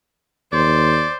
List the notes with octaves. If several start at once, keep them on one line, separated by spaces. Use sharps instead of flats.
D#2 C5 D5